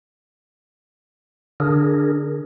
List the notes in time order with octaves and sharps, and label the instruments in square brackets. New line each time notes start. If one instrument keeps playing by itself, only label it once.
[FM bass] D3 [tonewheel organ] D4 G#4 A#4